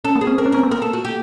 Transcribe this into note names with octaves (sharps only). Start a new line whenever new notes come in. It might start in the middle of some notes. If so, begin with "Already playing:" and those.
C#4 A4
A#3
G#4
C4
C4 A#4
C#4
C4 A#4
B3
A#3 A#4
A4
F#4
G4